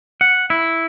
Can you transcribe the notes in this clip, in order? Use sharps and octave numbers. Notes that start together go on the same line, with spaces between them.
F#5
E4